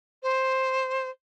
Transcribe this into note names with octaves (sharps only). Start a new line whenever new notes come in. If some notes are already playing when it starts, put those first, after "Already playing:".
C5